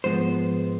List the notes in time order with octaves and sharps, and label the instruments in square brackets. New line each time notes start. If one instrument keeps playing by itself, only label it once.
[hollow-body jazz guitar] G#2 F3 G#3 B3 C5